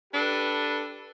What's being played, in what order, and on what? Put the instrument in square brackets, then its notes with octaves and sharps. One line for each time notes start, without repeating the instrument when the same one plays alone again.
[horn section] D4 G4 A4 B4